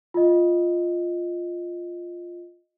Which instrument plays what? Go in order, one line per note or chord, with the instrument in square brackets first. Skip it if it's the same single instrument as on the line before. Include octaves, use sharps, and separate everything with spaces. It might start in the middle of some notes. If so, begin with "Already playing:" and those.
[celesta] F4 D#5